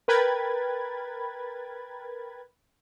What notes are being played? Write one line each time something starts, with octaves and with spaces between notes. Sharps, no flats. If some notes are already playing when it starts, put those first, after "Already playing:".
A#4 B4 G5 B5 G#6 A6